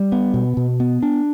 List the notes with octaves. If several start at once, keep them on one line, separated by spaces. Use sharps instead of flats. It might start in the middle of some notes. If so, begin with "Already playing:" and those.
Already playing: G3
B3
B2
B2
B3
D4